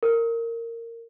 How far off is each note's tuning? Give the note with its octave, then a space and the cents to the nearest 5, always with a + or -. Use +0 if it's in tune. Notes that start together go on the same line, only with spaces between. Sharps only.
A#4 -15